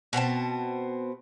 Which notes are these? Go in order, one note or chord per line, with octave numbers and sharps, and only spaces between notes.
B2 B3 C4 A5